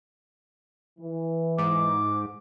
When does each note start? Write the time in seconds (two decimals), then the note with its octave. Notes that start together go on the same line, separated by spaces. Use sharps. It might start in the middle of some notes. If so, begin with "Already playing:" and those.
0.99 E3
1.58 G#2 D6